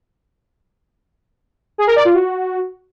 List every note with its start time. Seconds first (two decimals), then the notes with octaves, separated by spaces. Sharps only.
1.78 G#4
1.87 A#4
1.96 D5
2.05 F4
2.14 F#4